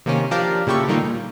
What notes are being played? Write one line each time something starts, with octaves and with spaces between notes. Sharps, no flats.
C3 D#3 A#3 C4 C#4
F3 D4 G4 A#4 D5 F5
A#2 C#3 E4 G4 A4 C#6
D3 D#3 G3 A#3 D#4 F4
A#2